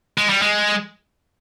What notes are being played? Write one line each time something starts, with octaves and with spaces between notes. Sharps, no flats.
G#3
G3
G#3